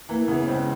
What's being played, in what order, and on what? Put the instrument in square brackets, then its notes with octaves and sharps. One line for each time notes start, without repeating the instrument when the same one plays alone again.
[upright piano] E3 [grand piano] A#3
[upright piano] C#3 [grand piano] B3
[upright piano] C#2 [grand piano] C4